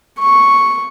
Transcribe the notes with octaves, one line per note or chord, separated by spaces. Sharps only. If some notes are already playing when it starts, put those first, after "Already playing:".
C#6